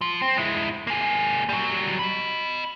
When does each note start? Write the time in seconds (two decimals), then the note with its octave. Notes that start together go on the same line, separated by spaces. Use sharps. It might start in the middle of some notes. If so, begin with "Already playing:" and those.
0.01 F3
0.22 C4
0.37 G#3 E4
0.87 A#3 G#4
1.49 F#3 G3
1.99 D#5 B5